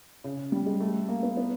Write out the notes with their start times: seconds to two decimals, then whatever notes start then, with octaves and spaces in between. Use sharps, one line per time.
0.24 C#3
0.52 G3
0.66 G#3
0.80 A3
1.09 A#3
1.23 B3
1.37 B3